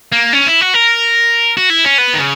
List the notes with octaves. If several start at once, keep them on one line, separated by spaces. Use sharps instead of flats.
A#3
C#4
E4
F#4
A#4
F#4
E4
C#4
B3
D#3
C#3